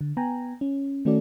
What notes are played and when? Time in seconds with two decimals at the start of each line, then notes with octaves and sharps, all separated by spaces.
0.01 D3
0.17 B3 G5 G#5 A#5
0.61 C#4
1.05 D#3 A3 C#4 F#4 A4 D5